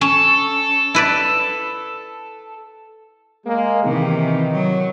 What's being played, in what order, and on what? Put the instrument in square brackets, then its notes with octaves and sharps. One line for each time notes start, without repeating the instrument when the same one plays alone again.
[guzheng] C#4 [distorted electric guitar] A4
[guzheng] E4 B4 D5
[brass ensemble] G#3 A#3
[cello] C3 E3 [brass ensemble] D#3
[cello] F#3